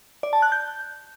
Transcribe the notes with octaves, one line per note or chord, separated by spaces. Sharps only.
D5
A5
F#6
G6